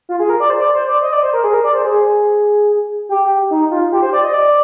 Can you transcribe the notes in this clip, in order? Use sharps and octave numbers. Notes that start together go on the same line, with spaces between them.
F4
G#4
A#4
D5
C5
D5
C5
D5
D#5
D5
C5
A#4
G#4
A#4
D5
C5
G#4
G4
D#4
F4
G4
C5
D5
D#5
D5